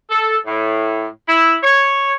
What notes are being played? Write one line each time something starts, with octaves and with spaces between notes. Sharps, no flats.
A4
A2
E4
C#5